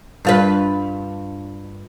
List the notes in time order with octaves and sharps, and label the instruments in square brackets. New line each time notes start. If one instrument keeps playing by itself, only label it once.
[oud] G2 F4 B4